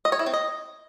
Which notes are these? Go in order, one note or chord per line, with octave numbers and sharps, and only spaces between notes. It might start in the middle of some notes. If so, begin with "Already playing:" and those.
D#5
C#5
E4
C4
D#5